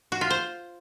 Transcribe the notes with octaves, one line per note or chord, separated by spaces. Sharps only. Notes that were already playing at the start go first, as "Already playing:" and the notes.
F#4
F4
C5